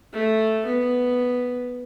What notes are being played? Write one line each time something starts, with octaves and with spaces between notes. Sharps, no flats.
A3
B3